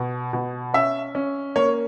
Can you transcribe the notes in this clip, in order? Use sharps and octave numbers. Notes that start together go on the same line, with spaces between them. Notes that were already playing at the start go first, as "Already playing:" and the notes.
Already playing: B2
B2
C#4 E5
C#4
A#3 C#5